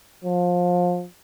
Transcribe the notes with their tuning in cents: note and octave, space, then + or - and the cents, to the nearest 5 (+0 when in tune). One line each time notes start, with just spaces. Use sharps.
F3 +25